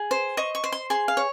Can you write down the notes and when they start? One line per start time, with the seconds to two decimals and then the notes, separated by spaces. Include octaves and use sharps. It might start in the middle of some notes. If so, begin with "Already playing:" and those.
Already playing: G#4
0.11 C5
0.37 D#5 C#6
0.55 C#6
0.64 C5
0.72 C6
0.90 G#4 C6
1.08 F5
1.17 C#5